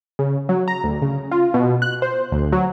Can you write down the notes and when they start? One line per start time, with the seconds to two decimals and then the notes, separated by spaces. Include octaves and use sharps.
0.19 C#3
0.49 F#3
0.68 A#5
0.84 D2
1.02 C#3
1.31 F4
1.54 B2
1.82 F#6
2.02 C5
2.32 D2
2.52 F#3